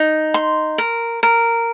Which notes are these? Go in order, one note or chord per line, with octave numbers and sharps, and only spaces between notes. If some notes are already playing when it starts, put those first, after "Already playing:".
Already playing: D#4
C6
A#4
A#4